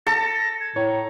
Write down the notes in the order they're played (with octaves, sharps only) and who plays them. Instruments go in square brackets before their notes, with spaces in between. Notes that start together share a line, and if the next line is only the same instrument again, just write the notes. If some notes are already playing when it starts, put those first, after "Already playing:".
[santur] A4 [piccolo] A#6
[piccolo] G#6
[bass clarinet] A2 [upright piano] C#5 [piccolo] A#5